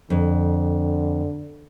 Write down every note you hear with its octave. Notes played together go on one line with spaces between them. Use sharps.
F2 D3